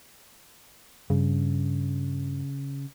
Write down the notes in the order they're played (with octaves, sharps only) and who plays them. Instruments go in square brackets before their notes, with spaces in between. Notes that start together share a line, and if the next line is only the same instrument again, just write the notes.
[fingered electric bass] G2 [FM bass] C#3